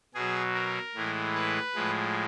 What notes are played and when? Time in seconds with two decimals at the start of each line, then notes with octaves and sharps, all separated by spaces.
0.14 B2 F#3 G#4
0.54 A#4
0.95 A2 E3 G#3
1.35 B4
1.75 A2 F3 G#3